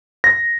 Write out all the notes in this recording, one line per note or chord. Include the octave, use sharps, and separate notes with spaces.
A#6